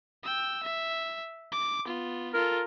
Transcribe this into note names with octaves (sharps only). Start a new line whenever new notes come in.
G5 E6
E5
D6
B3 F4
F4 A4 A#4